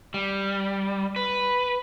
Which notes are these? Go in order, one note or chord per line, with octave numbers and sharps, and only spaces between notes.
G3
B4